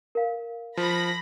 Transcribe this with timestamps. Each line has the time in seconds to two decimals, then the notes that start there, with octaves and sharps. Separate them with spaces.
0.15 A#4 F5
0.77 F3 B5 A#6